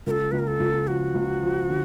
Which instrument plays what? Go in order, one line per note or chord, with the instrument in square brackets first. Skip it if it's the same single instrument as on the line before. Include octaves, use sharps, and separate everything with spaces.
[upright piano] C#2 [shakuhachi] A4 A#4
[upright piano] C#2 [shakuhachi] B4
[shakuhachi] A#4
A4
[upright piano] C#2
[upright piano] F3 [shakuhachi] F#4
[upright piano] C#2
F3
D3